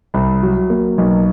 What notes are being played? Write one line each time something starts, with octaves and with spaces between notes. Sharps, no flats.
C2
F#3
A#3
B1